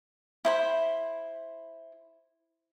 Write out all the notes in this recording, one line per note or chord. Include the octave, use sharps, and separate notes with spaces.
E4 C5 B5